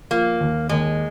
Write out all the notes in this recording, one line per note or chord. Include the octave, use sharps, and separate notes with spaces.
F3 A#3
D#2
D#2 G#3